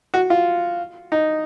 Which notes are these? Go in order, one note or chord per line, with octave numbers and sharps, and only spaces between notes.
F#4
F4
D#4